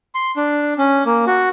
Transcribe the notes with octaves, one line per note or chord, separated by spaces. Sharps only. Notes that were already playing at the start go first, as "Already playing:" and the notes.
C6
D4
C#4
A#3
F#4